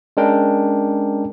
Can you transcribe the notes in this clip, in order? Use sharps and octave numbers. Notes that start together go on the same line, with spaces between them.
G#3 C#4 D4 A#4 G5